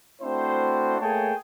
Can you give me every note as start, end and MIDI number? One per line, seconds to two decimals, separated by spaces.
0.22 0.96 57
0.22 0.96 60
0.22 0.96 62
0.22 0.96 64
0.22 0.96 66
0.22 0.96 72
1.00 1.33 57
1.00 1.33 58
1.00 1.33 68
1.00 1.33 73
1.00 1.33 79
1.00 1.33 81